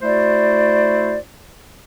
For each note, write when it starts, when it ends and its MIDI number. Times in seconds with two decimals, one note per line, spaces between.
0.02 1.16 57
0.02 1.16 64
0.02 1.16 66
0.02 1.16 72
0.02 1.16 74